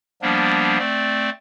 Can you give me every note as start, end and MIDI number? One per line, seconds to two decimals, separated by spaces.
0.22 0.78 53
0.22 0.78 55
0.22 0.78 58
0.22 0.78 59
0.22 0.78 62
0.79 1.30 57
0.79 1.30 60
0.79 1.30 74